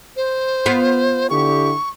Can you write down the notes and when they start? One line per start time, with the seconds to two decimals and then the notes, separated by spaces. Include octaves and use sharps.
0.17 C5
0.66 B3 F4
1.30 D3 E4 G4 C#6